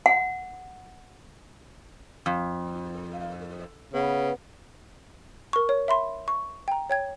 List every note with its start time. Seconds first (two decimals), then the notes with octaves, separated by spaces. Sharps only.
0.06 F#5
2.26 F2
3.94 C#3 B3
5.53 A#4 C#6
5.69 C#5
5.88 E5 B5 C6
6.28 C#6
6.68 G5 A#5
6.90 C#5 G5 G#6